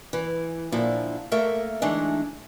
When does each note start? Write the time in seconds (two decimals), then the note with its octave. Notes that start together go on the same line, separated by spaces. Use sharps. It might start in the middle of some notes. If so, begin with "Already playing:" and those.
0.13 E3
0.72 A#2 D3 F3 E4 A4
1.32 A3 A#3 A4 A#4 E5
1.82 D3 E3 G#3 A3 D4 D#4